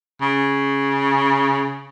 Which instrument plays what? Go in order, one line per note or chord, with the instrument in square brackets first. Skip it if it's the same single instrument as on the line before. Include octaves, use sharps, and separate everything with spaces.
[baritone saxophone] C#3